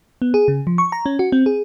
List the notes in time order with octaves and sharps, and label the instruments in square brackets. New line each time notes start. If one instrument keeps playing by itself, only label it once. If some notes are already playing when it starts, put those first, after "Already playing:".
[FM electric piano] B3
G#4
C#3
F3
C#6
A#5
C#4
F#4
C4
G#4